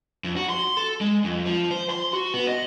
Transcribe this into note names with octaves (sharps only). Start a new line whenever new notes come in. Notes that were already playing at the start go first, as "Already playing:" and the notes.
F2
F#4
C6
A4
G#3
F2
F3
C5
C6
F#4
B3
D#5